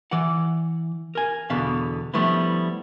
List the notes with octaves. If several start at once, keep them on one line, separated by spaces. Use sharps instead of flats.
E3 D5 F#5
A#4 G#5
E2 B2 D3 B3 F5
F3 G3 A3 B3 D4 E4